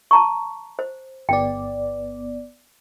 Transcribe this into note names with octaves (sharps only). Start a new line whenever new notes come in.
A5 A#5 C#6
C5
G1 B3 D5 G5